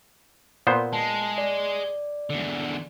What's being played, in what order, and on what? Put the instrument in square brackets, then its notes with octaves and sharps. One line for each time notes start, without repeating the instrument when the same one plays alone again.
[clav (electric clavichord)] A#2 B3 C5
[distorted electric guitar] G#3 [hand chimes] A5
[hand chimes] D5
[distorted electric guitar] E2 D3